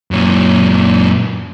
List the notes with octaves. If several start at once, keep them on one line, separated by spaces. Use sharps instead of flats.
F#2 A#2